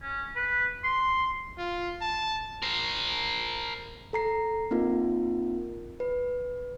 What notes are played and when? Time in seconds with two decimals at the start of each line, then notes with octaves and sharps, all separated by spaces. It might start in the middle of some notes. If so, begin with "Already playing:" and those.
0.02 C#4
0.36 B4
0.84 C6
1.58 F4
2.01 A5
2.62 A#4 C5
4.13 A4 A#5 C7
4.71 A#3 C4 D#4 F4 A#4
6.00 B4